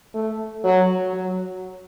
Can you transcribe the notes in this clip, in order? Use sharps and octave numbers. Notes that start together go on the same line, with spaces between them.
A3
F#3
F#3